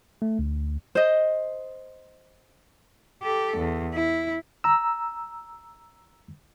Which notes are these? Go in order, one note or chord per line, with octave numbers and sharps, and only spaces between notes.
A3
D2
C5 D#5
G4 A4
E2
E4
A#5 E6